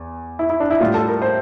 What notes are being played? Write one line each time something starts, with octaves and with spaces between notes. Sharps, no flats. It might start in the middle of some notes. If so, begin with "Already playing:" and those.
Already playing: E2
E4
E4
D4
E4
A2 G3 F4
A4
A#4
C5